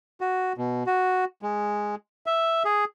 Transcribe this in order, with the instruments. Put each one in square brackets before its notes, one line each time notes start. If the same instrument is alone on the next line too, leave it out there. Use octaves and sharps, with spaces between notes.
[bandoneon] F#4
B2
F#4
G#3
E5
G#4